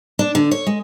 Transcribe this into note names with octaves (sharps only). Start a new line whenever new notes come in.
D4
D3
C#5
G#3